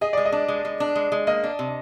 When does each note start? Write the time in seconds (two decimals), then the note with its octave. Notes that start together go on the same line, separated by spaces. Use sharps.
0.01 G#4 D#5
0.13 G#3 D5
0.25 D#5
0.32 D4
0.48 G#3
0.65 G#3
0.80 D4
0.96 G#3
1.12 G#3
1.27 A#3 D#5
1.44 D4
1.59 C3